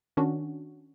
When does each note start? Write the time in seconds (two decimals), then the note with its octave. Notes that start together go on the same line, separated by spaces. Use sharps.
0.17 D#3 C#4 D4 F#4